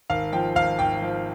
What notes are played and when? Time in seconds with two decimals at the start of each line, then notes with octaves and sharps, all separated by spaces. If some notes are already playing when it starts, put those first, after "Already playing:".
0.10 G#1 F5
0.33 F3 G5
0.55 G#1 F5
0.79 G#1 G5
1.02 F3